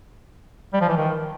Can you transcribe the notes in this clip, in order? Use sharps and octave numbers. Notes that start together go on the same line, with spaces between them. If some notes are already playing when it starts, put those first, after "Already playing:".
G3
F3
E3
D#3